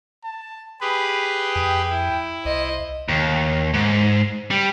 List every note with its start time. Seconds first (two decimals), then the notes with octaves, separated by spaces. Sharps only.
0.24 A5
0.81 G4 G#4 B4 B5
1.56 F2 G5
1.90 E4
2.45 C2 C5 D#5
3.08 D#2
3.74 G#2
4.51 G3